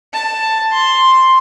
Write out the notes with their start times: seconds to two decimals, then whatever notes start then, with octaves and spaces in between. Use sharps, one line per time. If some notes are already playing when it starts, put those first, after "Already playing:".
0.13 A5
0.72 C6